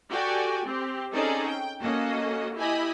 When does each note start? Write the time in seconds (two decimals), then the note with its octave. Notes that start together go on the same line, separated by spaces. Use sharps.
0.11 F#4 G4 A4 D5 G5 G#5
0.66 C4 G4
1.13 C4 C#4 D#4 G#4 A4 D5
1.47 G5
1.81 A#3 C#4 F#4 A4 D#5
2.57 E4 G4 D#5 G#5 B5